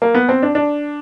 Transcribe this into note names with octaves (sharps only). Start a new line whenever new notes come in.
A#3
B3
C4
D4
D4